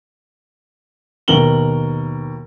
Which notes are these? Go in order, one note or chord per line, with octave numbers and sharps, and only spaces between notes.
D#2 B2 A#4 F#7 G7